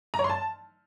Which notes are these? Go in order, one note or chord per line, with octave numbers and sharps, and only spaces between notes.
A#5
C#5
C6
A5